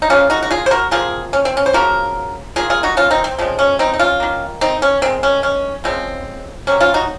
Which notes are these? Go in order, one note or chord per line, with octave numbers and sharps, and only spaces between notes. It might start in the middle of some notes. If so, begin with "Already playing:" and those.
D#4
C#3 F3 A#3 C#4 F4
D#4 F#4
F#4
F4 G#4
C5
F#4 A#4
C3 F3 A#3 F4 G#4
C#4
C4
C#4
C5
C#3 F3 A#3 F#4 A#4
D#3 A#3 F4 G#4
F4 G#4
D#4 F#4
C#4 F4
C4 D#4
C4
C#3 F3 G#3 C4
C#4
C4 D#4
D#4
C#4 F4
D#3 A#3
C4 D#4
C#4
D#3 G#3 C4
C#4
C#4
C#3 F3 G#3 C4
C3 F#3 A#3 C#4
C#4 F4
D#4 F#4